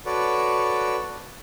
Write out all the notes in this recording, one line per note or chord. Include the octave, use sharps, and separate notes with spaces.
F#4 A4 B4 C#5 D5